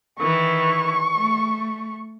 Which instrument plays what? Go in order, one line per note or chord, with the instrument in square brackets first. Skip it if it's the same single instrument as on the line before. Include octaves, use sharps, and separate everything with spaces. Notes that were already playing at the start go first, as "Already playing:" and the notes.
[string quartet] D#3 E3 [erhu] C#6
[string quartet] A3